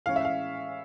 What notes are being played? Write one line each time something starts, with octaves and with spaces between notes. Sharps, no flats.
A2 E3 G#3 C#4 F5
E5
F5